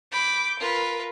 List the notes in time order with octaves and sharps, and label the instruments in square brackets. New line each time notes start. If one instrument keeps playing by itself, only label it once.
[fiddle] B5 [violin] D6 G6
[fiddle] F4 B4 [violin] A#4